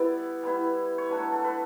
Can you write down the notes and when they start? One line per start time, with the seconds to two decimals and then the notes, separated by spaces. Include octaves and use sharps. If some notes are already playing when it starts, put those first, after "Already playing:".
Already playing: G3 B3 E4 D5
0.43 G3 B3 E4
0.98 C#5
1.10 F#3 A3 D4 B4
1.32 A4
1.44 B4